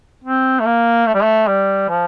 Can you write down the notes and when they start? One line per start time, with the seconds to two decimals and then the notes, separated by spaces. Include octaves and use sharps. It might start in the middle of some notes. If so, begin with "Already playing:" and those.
0.24 C4
0.60 A3
0.66 A#3
1.06 A3
1.15 G3
1.23 A3
1.48 G3
1.89 F3